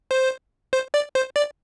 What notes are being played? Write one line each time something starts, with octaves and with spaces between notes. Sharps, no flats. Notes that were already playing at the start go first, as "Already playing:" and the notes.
C5
C5
D5
C5
D5